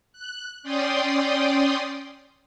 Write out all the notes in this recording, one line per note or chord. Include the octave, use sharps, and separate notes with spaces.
F#6
C#4 D5 G5 C6 D#6